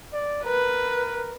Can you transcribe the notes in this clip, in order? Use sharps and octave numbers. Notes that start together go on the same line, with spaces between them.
D5
A#4 B4